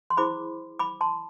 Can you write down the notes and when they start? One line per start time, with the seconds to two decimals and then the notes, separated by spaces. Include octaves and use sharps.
0.10 C6
0.17 E4 G#4 C5 B5 D6
0.79 B5 D6
1.01 A5 C6